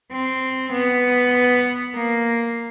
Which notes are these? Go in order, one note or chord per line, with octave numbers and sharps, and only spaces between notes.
C4
B3
A#3